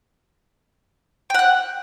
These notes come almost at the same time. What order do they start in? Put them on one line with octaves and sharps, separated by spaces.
G5 F#5 F#6